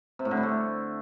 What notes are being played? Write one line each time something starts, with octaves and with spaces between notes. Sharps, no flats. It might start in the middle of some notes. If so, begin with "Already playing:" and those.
C3
A2
D3
G3
A3